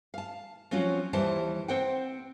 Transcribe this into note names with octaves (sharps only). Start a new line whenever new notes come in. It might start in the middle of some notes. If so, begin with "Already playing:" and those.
F5 A5
F3 F#3 C4 C#4 F4 F#4
D#2 E3 G3 C5 A5
C4 C5 F#5 G5